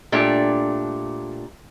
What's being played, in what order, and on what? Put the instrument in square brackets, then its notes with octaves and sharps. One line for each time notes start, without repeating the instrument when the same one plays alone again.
[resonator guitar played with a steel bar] A#2 A3 D4 G4